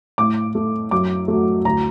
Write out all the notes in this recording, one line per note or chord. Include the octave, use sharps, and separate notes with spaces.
A2 D6
A3
F#2 D6
F#3 A3
D2 A#5